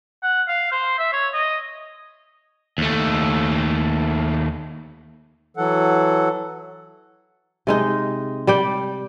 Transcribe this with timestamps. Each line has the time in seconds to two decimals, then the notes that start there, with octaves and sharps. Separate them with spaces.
0.23 F#5
0.48 F5
0.72 C5
0.99 E5
1.13 C#5
1.34 D#5
2.78 D#2 A3
5.57 E3 F#3 A4 F#5
7.67 C3 G#3 D#4
8.47 G3 D5 G5